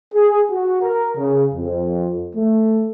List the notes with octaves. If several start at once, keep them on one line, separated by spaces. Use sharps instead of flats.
G#4
F#4
A#4
C#3
F2
A3